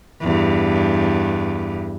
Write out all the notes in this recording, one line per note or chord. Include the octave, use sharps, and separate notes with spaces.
E2 G2